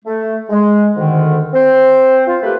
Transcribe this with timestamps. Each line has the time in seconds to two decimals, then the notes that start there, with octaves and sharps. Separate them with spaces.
0.05 A3
0.50 G#3
0.97 D2 G#2 D3 D#3
1.54 C4 C5
2.27 F4
2.42 A3 A#3 G4 A#4 B4